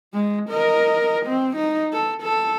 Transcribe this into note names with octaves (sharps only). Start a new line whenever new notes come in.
G#3
A#4 D#5
C4
D#4
A4
A4